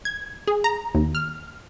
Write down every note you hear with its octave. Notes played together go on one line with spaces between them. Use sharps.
G#6
G#4
A#5
D#2
F6